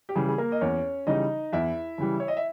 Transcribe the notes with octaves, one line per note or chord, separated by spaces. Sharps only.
G4
C#3 E3 G3 G#4
G#4
A#3 A#4
D#5
E2 C#4 C#5
C#3 E3 G3 D#4 D#5
E2 E4 E5
C#3 E3 G3
C#5
D#5
E5